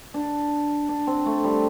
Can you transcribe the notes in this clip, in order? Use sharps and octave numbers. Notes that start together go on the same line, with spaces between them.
D4
D4
C4
A3
G3